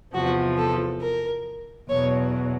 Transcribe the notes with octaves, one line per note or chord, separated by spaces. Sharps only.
E2 C3 F3 F#4
A4
A#4
E2 B2 F#3 C#5